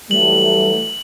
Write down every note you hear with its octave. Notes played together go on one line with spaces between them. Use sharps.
E3 F#3 G3 A3 F#7